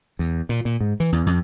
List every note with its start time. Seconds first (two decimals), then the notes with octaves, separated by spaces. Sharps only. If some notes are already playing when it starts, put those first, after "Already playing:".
0.19 E2
0.49 A#2
0.65 A#2
0.81 G#2
1.00 E3
1.12 E2
1.26 F2